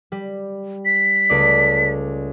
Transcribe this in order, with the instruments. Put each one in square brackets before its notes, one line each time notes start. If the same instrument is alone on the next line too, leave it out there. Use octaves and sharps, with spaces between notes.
[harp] G3
[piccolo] B6
[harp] C#2 A3 D5